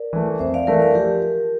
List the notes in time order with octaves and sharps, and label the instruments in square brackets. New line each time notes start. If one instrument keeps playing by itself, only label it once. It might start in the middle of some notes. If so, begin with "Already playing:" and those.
Already playing: [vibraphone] A#4 D5
[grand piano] E3 A3
[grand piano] F2 [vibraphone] C5 E5
[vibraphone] D5 F5
[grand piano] E3 A3 [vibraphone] A#4 D5
[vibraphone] A#4 D5
[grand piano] F3 [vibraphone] G4 A#4